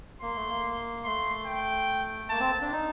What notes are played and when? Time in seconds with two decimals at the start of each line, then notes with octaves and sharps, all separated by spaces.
0.22 A#3 C6
0.36 A3
0.49 A#3
1.04 A3 C6
1.46 G5
2.30 A#3 A5
2.40 C4
2.61 D4
2.72 D#4